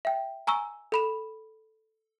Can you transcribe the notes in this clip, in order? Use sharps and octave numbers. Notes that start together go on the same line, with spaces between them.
E5 G5
G#5 A#5 C#6 E6
A4 B5 E7